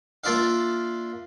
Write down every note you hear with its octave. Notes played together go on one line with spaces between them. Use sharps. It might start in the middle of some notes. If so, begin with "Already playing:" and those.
A#3 D4 F4 D5 E5 F5